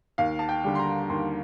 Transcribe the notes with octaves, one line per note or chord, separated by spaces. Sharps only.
D#2 F5
A5
G5
D3 G3
C6
A#5
D#2 C6